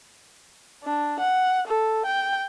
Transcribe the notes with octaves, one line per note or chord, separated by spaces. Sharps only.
D4
F#5
A4
G5